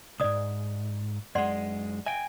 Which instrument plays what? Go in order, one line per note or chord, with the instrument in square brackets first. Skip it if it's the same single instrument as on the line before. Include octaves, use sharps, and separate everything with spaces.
[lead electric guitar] C2 G#2 [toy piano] D5 D#6
[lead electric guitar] F#2 G#3 [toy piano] D5 F#5 C6
[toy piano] E5 [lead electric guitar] G5 G#5